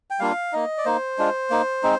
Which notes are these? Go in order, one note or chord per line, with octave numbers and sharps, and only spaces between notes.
G5
G3 A#3 D4 F4 F5
A#3 D#4 D#5
D5
A#3 D#4 C5
G#3 D4 F4
A#3 D#4
G#3 C4 D#4